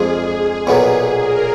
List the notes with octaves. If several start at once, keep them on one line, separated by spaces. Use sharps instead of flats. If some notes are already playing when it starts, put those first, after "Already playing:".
Already playing: F2 F3 G#3 D4 F4 G#4
B1 A#2 F#3 B3 G#4
A#4